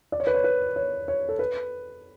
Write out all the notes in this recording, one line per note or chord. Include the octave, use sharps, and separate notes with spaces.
D5
C#5
B4
C#5
B4
C#5
C#5
A4
B4